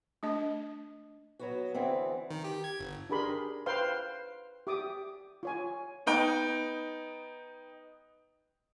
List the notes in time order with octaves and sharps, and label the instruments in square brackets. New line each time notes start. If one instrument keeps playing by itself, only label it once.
[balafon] A3 D4 D#5
[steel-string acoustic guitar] F#3 B3 F#4
D3 E3 B3 C4
[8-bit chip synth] D#3
G4
G#6
G1
[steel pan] D4 G4 G#4 A#4 B5 C6
B4 C5 F5 G5 C6
G4 E5 D6 D#6
F4 C#5 G#5
[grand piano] B3 D#4 G5